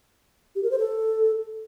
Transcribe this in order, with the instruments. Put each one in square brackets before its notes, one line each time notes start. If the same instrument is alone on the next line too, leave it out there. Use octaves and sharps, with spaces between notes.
[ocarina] G4
A#4
C5
A4